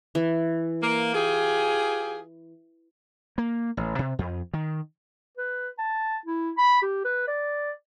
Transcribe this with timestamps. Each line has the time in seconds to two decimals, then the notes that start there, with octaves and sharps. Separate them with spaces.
0.15 E3
0.82 A#3
1.15 F4 G4 G#4
3.38 A#3
3.77 A1
3.99 C3
4.19 F2
4.54 D#3
5.37 B4
5.78 A5
6.26 E4
6.57 B5
6.82 G4
7.05 B4
7.28 D5